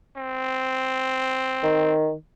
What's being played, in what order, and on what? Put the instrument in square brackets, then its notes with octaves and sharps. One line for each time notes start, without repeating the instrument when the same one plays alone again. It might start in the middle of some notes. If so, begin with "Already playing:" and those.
[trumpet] C4
[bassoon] D#3